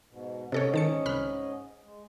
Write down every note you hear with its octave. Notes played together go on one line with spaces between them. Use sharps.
G#2 B2
G#2 C3 C#4 A4 C#5 D#5
D#3 A5 C#7
C2 B5 F6
G#3